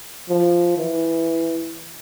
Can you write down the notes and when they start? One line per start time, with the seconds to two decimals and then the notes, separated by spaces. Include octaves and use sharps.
0.30 F3
0.77 E3